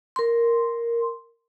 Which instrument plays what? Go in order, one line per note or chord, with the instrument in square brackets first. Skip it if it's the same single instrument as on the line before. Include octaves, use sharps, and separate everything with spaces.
[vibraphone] A#4 C6